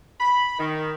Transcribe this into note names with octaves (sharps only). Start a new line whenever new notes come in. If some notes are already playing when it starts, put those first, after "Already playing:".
B5
D#3